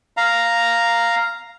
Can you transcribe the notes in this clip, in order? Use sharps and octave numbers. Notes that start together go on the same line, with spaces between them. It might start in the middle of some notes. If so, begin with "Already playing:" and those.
F5 A#5